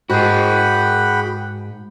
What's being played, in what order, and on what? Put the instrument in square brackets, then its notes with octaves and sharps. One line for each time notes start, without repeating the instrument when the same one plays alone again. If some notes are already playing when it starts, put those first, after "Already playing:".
[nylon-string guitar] G#2 [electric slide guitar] F#4 G#4 [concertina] F#5 G5 B5